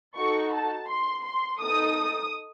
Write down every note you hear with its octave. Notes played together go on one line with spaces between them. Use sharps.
D#4 F#4 A4 C#6
A5
C6
C6
D#4 A4 D#6